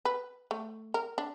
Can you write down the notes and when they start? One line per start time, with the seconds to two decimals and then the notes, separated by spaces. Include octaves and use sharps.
0.05 B4
0.51 A3
0.94 A#4
1.18 D4